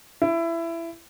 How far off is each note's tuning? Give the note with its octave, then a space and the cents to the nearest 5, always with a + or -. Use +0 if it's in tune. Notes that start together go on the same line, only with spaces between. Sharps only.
E4 +20